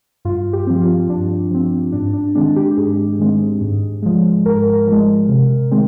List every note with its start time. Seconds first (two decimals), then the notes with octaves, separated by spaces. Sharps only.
0.25 G2 F4
0.53 G4
0.67 F3 C4
0.81 F4
1.09 G2 D4
1.51 F3 C4
1.92 G#2 D4
2.13 D4
2.35 D#3 G#3 C4 D4
2.56 G4
2.71 G4
2.77 G#2 G#4
3.19 D#3 G#3 C4
3.61 G#2
4.02 F3 G#3
4.45 G#2 A#4
4.87 F3 G#3
5.28 C3
5.71 D#3 G#3 C4